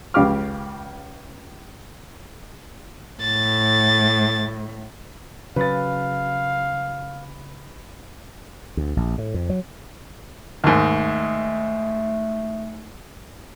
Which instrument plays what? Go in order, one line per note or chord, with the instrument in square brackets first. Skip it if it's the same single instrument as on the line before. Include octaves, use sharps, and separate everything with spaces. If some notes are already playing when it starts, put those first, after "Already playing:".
[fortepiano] C#2 C#3 G4 F5 D6 F6
[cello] A2 [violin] A6
[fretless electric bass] C#3 F#3 [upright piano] B4 B5 A6 [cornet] F5
[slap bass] D2
A#1
A2
F2
F#3
[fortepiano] D#2 G#2 [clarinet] A3